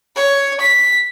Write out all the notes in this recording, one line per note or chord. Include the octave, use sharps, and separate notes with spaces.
C#5
B6